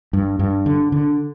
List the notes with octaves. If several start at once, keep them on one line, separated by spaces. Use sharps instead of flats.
G2
G2
D3
D3